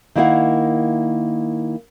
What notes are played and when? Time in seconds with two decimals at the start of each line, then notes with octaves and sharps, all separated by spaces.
0.15 D#3 A#3 E4 C5 F5 F#5